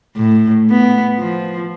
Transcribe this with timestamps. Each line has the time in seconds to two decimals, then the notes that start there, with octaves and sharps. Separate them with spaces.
0.17 A2
0.70 B3
1.19 F3